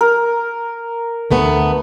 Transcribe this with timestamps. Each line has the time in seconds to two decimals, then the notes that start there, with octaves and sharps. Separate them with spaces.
0.01 A#4
1.31 D2 A3 B3